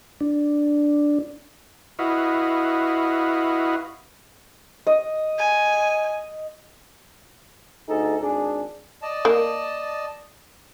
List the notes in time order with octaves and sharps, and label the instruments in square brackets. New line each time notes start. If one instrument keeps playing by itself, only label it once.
[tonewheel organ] D4
[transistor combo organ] E4 F#4 B4 D#5 F5
[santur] D#5
[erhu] G#5
[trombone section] D2 D#4 G#4 A4
G#1 D4 G#4
[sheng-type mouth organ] D5 D#5 A5
[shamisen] A#3